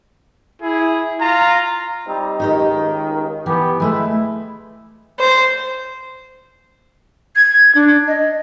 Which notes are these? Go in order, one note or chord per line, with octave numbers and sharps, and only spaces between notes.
E4 G#4
F4 A#5
G3 C4 D#4
C#2 D#3 D#4 G4 D#5
E3 B3 G4
E3 G#3 A3 E4 B4
C5
G#6
D4
D#5